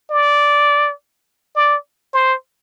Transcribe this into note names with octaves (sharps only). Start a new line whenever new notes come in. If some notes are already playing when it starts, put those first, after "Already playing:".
D5
D5
C5